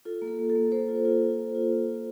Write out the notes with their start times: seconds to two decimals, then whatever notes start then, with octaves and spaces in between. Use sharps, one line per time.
0.05 F4 A4
0.22 A#3
0.28 A4
0.39 A#3
0.50 A4
0.56 A#3
0.72 A#3 A4 C5
0.89 F4
1.05 F4
1.22 F4
1.39 A#3
1.55 F4
1.72 F4
1.88 F4